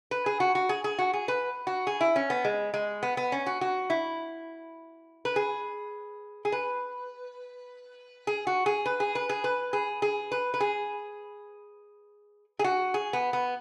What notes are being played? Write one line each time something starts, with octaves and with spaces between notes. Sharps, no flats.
B4
G#4
F#4
F#4
G#4
G#4
F#4
G#4
B4
F#4
G#4
E4
C#4
B3
G#3
G#3
B3
B3
C#4
F#4
F#4
E4
B4
G#4
G#4
B4
G#4
F#4
G#4
B4
G#4
B4
G#4
B4
G#4
G#4
B4
B4
G#4
G#4
F#4
G#4
B3
B3